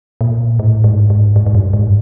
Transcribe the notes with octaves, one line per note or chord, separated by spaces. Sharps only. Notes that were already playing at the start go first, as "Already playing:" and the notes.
A#2
A2
G#2
G#2
G#2
G#2
G2
G#2